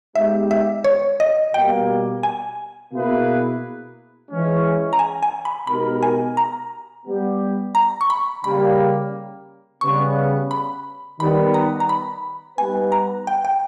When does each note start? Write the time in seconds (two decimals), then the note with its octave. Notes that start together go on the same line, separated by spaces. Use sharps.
0.15 G#3 B3 D#4 G4 E5
0.51 E5
0.84 C#5
1.20 D#5
1.54 B2 G3 A#3 G5
2.23 G#5
2.92 B2 A#3 E4 G#4 B4
4.30 E3 G#3 C#4
4.93 A#5
4.99 G#5
5.23 G#5
5.45 B5
5.67 B2 G#3 D#4 G4 A#4 B5
6.03 G#5
6.37 A#5
7.06 G3 B3 G4
7.75 A#5
8.01 C#6
8.10 B5
8.44 C#3 G3 A#3 B5
9.81 C#3 G3 B3 C#6
10.51 B5
11.20 D#3 G3 B3 B5
11.54 A#5
11.80 A#5
11.89 B5
12.58 G3 B3 D#4 G4 B4 G#5
12.92 A#5
13.27 G5
13.45 G5